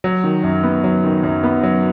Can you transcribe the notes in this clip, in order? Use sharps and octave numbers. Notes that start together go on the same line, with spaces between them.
F#3
D#3
F#2
B3
F#3
D#3
F#2
B3
F#3